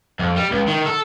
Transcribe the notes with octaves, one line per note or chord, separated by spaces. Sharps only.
F2
G3
C#2
D#3
A4